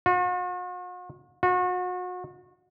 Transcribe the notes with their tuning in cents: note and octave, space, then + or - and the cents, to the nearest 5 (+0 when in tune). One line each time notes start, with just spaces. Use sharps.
F#4 -45
F#4 -35